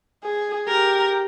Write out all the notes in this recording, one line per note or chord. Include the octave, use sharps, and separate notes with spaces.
G#4
G4 A#4